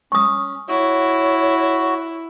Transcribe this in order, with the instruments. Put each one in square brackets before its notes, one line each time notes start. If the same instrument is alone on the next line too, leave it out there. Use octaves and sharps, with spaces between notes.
[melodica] C#4 [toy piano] C#6 D#6
[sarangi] E4 [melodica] F#4 [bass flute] C#5